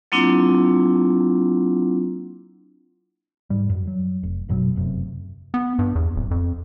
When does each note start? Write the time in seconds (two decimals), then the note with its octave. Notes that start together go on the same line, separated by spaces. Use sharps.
0.12 F#3 A#3 C4 D4 E4 F4
3.50 G#2 G3
3.69 F#2
3.87 F#3
4.23 F1
4.49 G1 F#2 B2 F#3
4.76 F1 F#2 C3
5.54 B3
5.79 G2
5.95 E2
6.16 D1
6.31 F2